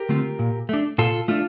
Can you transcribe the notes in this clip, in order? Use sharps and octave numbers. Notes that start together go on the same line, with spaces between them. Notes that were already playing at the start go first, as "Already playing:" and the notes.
Already playing: G4 A#4
D3 A3 C4 F4
A#2
A3 D4
A#2 F4 A4
A3 D4 F4